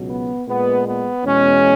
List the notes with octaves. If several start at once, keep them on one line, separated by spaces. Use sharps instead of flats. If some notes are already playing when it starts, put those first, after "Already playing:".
Already playing: C#2 B2 F#3
B3
A#2 G#3 B3
B3
E2 B2 G#3 C#4